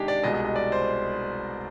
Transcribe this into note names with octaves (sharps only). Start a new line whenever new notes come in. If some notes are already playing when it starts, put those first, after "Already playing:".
Already playing: C3 D#3 G#3 D4 D#4 G4 G#4
D5
C2 B2 G#3 D#5
D#5
D#5
D5
C5